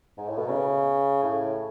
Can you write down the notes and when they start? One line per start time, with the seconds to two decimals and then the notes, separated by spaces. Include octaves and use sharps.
0.17 G#2
0.28 A2
0.38 B2
0.48 C#3
1.22 A2